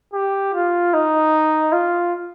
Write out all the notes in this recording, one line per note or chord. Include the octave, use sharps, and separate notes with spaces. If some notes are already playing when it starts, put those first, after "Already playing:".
G4
F4
D#4
F4